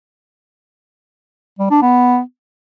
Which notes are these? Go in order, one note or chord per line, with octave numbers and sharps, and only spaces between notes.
G3
D4
B3